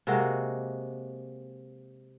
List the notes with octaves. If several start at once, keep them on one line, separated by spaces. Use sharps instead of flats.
C3 G#3 A#3 F#4